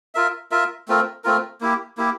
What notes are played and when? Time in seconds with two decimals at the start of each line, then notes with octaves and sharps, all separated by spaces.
0.15 F4 A#4 E5
0.51 F4 A#4 E5
0.88 A3 C4 F4 A#4
1.24 A3 C4 F4 A#4
1.61 A#3 E4 G4
1.97 A#3 E4 G4